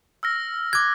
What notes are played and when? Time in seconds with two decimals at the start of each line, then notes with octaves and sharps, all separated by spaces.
0.23 E6 F6 A#6
0.73 D6 F#6 G#6